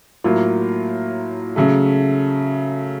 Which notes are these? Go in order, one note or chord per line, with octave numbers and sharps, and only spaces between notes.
A2 F#3 A#3 F4
C#3 F#3 A3